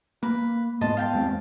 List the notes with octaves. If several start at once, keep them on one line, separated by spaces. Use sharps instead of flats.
A#3 B4
G#2 G#3 B3 D#5 A5 C6
F5 G5 A5
E2 G#3 C4